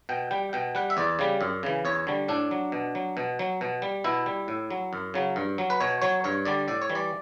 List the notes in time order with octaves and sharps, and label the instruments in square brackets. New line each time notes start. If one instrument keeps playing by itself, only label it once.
[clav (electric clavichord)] B2 G5
G3 G5
B2 G5
G3 F#5
E5
E2 D5
C#3 G3
F#2
C#3 E3
E2 C#5
D3 G3
A2 D4
F#3
B2
F#3
B2
F#3
B2
G3
B2 E4
G3
A2
F#3
F#2
C#3 F#3
G2
F#3
B4
B2 C#5
F#3 C#5
G2 C#5
D3 G3 D5
A2 D5
C#5
E3 G3
D5